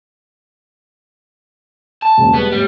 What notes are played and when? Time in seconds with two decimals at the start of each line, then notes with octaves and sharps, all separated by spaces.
2.02 A5
2.18 E1 C#3 A#3
2.34 G3 G#3 B3
2.52 A2 G3